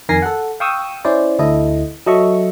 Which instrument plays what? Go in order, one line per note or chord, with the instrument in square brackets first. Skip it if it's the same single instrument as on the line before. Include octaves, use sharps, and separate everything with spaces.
[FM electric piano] F2 D#3 A#4 G#5 A#6 C7
A4 F#5
F5 G5 C#6 D#6 E6
C#4 E4 C5 D5
D2 E4 A4 D#5
F#3 A4 D#5 E5 C#6